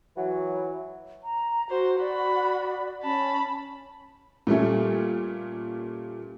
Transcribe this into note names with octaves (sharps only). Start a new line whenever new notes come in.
E3 F#3
A#5
F#4 C5
F#4 D5 B5
C#4 A5 B5
A#2 G3 A3 C#4